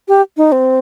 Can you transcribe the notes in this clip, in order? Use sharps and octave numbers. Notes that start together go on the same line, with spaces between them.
G4
D#4
C4